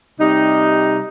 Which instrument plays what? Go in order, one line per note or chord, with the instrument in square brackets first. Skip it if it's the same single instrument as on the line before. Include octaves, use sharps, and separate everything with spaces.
[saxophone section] C3 G3 D#4